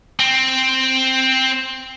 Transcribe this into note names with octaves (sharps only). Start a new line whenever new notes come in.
C4